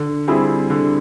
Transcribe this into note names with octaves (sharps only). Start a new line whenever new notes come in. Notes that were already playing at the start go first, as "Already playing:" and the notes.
Already playing: D3
G3 C4 E4 G#4
D3